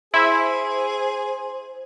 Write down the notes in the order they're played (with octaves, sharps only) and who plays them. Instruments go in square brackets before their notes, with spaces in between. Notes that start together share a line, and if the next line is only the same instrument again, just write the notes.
[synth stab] E4 [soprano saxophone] G#4 [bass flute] C5 [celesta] C6